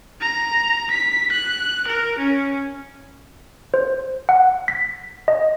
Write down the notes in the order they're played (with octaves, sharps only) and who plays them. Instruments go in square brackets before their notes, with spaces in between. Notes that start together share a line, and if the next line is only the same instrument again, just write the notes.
[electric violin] A#5
B6
F#6
A#4
C#4
[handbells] C5
F#5
B6
D#5